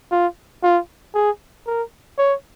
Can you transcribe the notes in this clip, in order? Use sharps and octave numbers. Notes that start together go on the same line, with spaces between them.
F4
F4
G#4
A#4
C#5